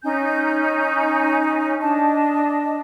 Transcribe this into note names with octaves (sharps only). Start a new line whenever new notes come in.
C#4 D#4 G#5 G6
D4 D#5 A5